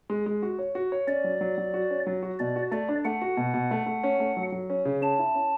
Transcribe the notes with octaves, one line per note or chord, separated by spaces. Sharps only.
G#3
G#3
F#4
C#5
F#4
C#5
C#4 D5
F#3
F#3
F#3
F#4
C#4
F#3
F#4
B2 D5
F#4
A3 D5
D4
A3 F#5
F#4
B2
B2
A3
A3
C#4
A3
F#3
F#3
C#4
C#3
C#4 A5
E4
C#4